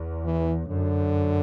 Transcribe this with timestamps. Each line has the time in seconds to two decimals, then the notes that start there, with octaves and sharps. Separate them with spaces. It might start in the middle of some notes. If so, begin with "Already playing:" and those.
Already playing: E2
0.25 E3
0.68 F#2 D3